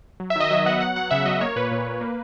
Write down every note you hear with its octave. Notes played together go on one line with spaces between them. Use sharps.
F#3
E5
D#3 D#5
F#3 E5
B3 F#5
F#3 F#5
F#3 F#5
C#3 E5
F#3 D#5
A#3 C#5
A#2 B4
A#2
A#3
A#3